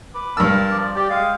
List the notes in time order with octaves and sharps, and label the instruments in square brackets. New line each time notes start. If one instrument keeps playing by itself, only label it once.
[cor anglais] B4 [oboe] D6
[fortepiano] G2 E6 [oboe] F4 [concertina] A#4 A5
[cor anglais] F3 [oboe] D5
[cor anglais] G4 [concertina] D5 [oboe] G5
[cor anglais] G#3 [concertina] F5